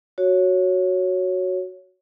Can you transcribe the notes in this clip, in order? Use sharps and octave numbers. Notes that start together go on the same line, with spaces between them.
F#4 C#5